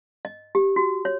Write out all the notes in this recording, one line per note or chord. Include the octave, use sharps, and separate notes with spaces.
D#5
G4
F#4
C#5